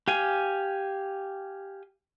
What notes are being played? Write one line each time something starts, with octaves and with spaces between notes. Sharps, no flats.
G4 F5 G#5